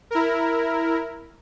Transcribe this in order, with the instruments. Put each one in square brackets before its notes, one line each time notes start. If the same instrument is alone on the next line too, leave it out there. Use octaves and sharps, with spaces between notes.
[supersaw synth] E4 A#4